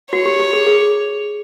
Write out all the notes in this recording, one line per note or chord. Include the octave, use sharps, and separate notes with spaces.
F#4 C#5
G4
G4
G#4
G#4